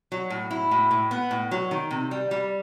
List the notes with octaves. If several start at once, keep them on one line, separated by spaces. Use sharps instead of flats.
F#3
A2
E4
A2
A2
B3
A2
F#3
D#3
C3
G3
G3